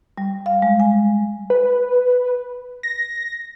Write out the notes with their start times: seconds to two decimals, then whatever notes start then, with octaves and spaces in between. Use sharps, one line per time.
0.18 G3
0.46 F5
0.62 G#3
0.80 G#5
1.50 B4
2.83 A#6